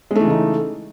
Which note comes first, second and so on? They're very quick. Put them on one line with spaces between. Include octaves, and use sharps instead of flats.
G#3 A3 E3 C#3 D#4